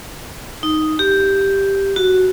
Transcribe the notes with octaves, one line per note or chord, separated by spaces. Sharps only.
D#4
G4
F#4